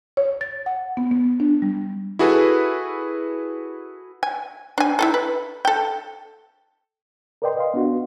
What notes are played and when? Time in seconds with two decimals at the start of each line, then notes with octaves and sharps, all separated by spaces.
0.17 C#5
0.41 A6
0.66 F#5
0.97 B3
1.11 B3
1.40 D4
1.62 G3
2.19 E4 F#4 G#4 A4 B4
4.23 G#5
4.78 D4 G#5
4.99 E4 F4 A4
5.14 B4
5.65 A4 G5
7.42 A#4 B4 D5 D#5 G5 C6
7.57 D#5 F5 C6
7.74 B3 D4 F#4